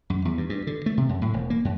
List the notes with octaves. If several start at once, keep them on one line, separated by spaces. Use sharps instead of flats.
F#2
E2
G2
G2
D3
A3
C3
F#2
A2
E1
A#3
F#2